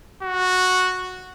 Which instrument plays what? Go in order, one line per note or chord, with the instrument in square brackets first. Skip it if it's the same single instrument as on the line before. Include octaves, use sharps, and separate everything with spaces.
[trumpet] F#4